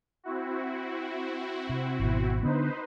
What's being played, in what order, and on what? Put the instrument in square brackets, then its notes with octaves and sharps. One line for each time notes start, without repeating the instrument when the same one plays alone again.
[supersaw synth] C4 E4 F#4
[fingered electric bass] C3
G#1 B2
[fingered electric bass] D3 B3 [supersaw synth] D#4 B4 C5